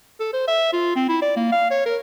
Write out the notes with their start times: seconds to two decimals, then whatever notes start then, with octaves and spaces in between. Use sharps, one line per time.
0.20 A4
0.33 C5
0.48 E5
0.73 F4
0.96 C4
1.09 E4
1.22 D5
1.36 A#3
1.52 F5
1.71 C#5
1.86 A#4